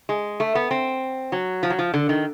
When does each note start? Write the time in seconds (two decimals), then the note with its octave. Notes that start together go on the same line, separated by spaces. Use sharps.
0.09 G#3
0.40 A3
0.55 B3
0.71 C4
1.32 F#3
1.63 F3
1.70 F#3
1.79 F3
1.94 D3
2.09 D#3